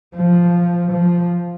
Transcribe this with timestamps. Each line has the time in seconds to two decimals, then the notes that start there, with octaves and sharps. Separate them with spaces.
0.16 F3
0.91 F3